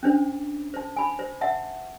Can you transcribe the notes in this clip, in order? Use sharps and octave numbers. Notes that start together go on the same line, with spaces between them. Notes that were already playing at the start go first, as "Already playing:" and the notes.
C#4 D4 C5
C5 A5
G#5 B5
C5
E5 F#5 A5